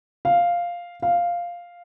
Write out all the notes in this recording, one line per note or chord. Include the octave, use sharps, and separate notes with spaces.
F5
F5